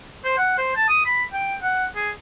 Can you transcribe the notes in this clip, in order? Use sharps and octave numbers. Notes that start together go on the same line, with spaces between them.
C5
F#5
C5
A5
D#6
B5
G5
F#5
G#4